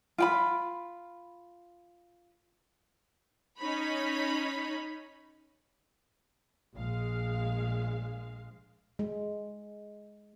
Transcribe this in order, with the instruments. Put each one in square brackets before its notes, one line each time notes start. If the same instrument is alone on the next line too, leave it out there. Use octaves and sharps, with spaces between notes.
[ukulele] F4 G5 B5
[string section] C#4 D#4 C#5 B5
A#1 G#3 F5
[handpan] G#3